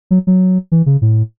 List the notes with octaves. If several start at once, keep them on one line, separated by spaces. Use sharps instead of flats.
F#3
F#3
E3
C#3
A2